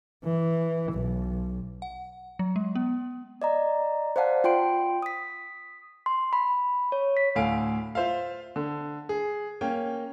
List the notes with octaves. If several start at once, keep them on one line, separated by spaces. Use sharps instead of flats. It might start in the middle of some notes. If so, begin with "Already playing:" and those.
E3
B1
F#5
F#3
G#3
B3
D5 D#5 A#5
C5 D5 F5 F#5 A5
F4 G5 C6 D7
D#6 B6
C6
B5
C#5
B6
D2 A2 F5 G#5 D7
F4 C5 E5 F5
D3
G#4
A#3 C#4 G5